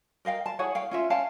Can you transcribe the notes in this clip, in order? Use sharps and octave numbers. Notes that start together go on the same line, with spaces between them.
A#4 D#5 F5 G5
A5
E4 G#4 C#5 F#5
F5 G5
C#4 F4 E5
C#4 F5 G5 A5